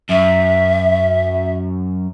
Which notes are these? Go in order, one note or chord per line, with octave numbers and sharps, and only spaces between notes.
F#2 E5